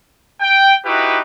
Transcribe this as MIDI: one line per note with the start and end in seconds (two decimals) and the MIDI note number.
0.40 0.75 79
0.86 1.19 63
0.86 1.19 64
0.86 1.19 66
0.86 1.19 67
0.86 1.19 71